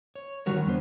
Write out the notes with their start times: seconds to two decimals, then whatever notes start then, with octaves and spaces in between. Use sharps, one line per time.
0.15 C#5
0.46 D#3 G3 F#4 A#4 C#5
0.66 E2 D3 B3 C5